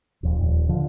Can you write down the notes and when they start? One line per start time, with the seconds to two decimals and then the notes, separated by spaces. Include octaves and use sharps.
0.23 D#1 F2
0.39 D#1
0.69 D3 F3